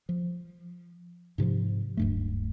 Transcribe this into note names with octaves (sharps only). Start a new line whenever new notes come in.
F3
G#2 C3 D#3 F3
D1 G2 A3